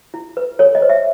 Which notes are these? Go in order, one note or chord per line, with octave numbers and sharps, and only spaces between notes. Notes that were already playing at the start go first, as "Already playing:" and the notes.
E4
B4
A4 C#5
D#5
C5
E5